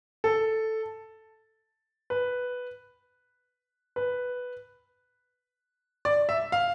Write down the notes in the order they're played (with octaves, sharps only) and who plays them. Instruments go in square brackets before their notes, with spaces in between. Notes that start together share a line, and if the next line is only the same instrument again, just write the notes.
[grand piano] A4
B4
B4
D5
E5
F5